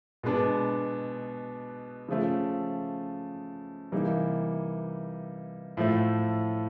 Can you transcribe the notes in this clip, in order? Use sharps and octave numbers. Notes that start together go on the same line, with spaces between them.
B2 G#3 B3 D4
C#3 F3 A3
C3 E3 G3 A#3 D#4
A2 F3 A3